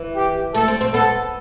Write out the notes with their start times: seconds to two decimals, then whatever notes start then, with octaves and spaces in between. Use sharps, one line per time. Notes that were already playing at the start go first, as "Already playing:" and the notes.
Already playing: E3
0.15 G4
0.54 A3 A4
0.68 C4
0.81 C4
0.93 B3 A4